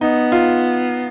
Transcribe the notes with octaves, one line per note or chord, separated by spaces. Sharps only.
B3 D#4
F4